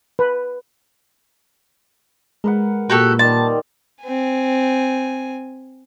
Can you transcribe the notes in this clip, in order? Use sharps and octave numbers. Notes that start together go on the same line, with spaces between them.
B4
G#3 A#4 B4 F#5
A#2 F#4 G4 A4
D#3 G3 A5 C6
C4 G#5